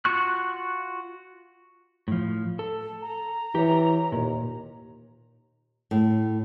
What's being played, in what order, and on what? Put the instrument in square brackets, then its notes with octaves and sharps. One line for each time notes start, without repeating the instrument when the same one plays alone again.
[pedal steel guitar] F4 F#4 C#6 F#6
[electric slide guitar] A2 F3
A4
[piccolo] A#5
[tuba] E3 [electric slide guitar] G4 C#5
[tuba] D#2 [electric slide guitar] A#2
[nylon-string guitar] A2